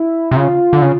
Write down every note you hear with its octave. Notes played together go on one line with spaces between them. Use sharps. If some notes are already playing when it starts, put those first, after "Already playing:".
Already playing: E4
C3
C#3 F4
D3
C#3